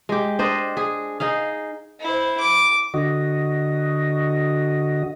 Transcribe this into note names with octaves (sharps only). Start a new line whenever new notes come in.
G#3 G4
D4 C5 D#5
G#4
D#4 G#4 F5
E4 C5
D6
D3 F#4 D#5